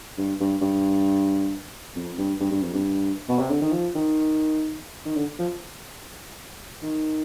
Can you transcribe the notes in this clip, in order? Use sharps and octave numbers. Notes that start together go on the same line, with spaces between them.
G2
G2
G2
F2
G2
G2
G2
F2
G2
B2
C3
D3
D#3
F3
D#3
D#3
D3
F3
D#3